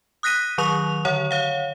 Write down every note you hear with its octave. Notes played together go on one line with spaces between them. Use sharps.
D#6 F#6 A#6 B6 D#7
D#3 F#3 C#6 D#6 F7
D3 C#5 F#5
C#5 F5 F#5